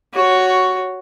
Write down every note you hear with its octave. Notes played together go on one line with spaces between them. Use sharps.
F#4 C#5